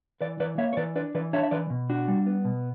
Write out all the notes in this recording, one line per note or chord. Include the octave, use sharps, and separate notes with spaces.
E3 B4 D5
E3 B4 D5
A#3 C#5 E5
C#5
E3 B4 D5
D4 B4 D5
E3 B4 D5
D4 C#5 E5
E5
E3 B4 D5
B2
D4 F#4
G3
B3
B2